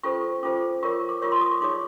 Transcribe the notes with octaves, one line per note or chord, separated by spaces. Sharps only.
C#4 F4 A4 C5 C#6
C#4 F4 A4 C5 D6
F4 A#4 C#5 C#6
D6
F4 A#4 C#5 C#6
C6
D#6
C#6
D#4 G#4 C#5 D6